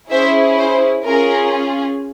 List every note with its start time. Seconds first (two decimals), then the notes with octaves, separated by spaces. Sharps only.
0.10 C#4 E4 G#4 C5 E5
0.58 C5
1.05 C#4 F4 G#4 A#4